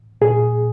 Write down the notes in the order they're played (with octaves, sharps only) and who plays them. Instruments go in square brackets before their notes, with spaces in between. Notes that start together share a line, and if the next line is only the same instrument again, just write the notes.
[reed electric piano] A#2 G#4